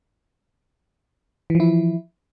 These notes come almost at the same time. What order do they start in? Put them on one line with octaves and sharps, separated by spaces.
E3 F3 E4